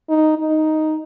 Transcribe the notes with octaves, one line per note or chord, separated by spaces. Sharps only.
D#4
D#4